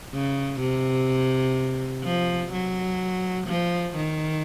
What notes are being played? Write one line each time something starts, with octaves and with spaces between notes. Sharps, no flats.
C#3
C3
F3
F#3
F3
D#3